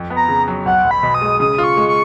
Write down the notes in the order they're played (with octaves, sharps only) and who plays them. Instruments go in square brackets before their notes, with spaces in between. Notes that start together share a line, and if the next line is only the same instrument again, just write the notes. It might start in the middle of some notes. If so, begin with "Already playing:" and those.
Already playing: [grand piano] F2
B3
[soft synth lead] A#5
[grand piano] C#3
F#3
[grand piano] B1 [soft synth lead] F#5
[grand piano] B1
[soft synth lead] B5
[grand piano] B2
[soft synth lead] D#6
[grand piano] G#3
[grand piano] C#3 [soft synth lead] D#6
[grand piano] F4
[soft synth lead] C#6
[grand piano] G#3
[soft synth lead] C#6